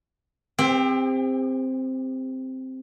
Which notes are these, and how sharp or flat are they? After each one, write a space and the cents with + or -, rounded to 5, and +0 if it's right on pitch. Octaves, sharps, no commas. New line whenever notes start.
C4 +0 G4 +40